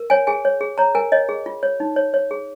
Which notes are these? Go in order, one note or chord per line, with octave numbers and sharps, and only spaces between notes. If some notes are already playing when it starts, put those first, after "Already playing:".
Already playing: A#4
C#5 G#5
G#4 G#5
C#5
G#4
C#5 A#5
A#4 G#5
C#5 D#5
G#4
F4
C#5
D#4
C#5
C#5
G#4